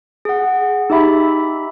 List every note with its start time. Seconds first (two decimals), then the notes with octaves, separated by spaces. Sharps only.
0.25 G#4 F#5
0.90 D#4 G4 E5 B5